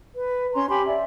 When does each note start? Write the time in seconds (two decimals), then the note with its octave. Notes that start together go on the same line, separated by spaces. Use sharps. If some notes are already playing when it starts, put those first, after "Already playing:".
0.14 B4
0.54 C#4 A#5 C6
0.69 G4 G#5 B5 C6
0.86 D5 E5